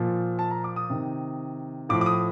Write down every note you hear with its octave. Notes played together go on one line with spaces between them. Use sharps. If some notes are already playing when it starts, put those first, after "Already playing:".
Already playing: A#2 F3
A5
A#5
D6
D#6
C3 D#3
A2 F3 D6
D6
D#6